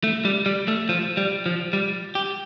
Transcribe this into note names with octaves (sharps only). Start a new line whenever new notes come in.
A3
G3
G3
A3
F3
G3
F3
G3
G4